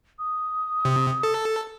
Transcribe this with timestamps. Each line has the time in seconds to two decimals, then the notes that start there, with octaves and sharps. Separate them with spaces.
0.19 D#6
0.85 C3
1.23 A4